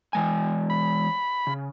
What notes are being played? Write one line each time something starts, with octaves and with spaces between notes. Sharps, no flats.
E3 G#3 G#5
B5
C#3